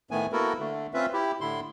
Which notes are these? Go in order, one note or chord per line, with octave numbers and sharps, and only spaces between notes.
A2 D#3 A3 B3 G#5
A#3 B3 E4 F#4 A4 A#4
D3 A3
C4 C#4 F4 B4 E5
E4 G4
A2 D3 E4 C6